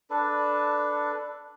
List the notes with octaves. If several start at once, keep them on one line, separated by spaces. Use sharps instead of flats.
D4 A4 B4